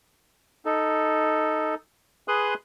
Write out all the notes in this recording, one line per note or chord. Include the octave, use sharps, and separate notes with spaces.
D#4 A4
G#4 B4 C6 D#6 F#6